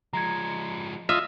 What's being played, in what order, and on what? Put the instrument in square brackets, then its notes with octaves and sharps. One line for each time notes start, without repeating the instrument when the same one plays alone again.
[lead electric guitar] F3 G#3 [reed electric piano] A#5 G#6
[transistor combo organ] F4 D#5 [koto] E5